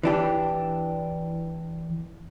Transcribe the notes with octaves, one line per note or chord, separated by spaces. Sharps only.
E3 D4 G4